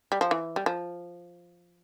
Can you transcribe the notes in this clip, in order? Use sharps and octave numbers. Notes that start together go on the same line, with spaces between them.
G3
F3
E3
G3
F3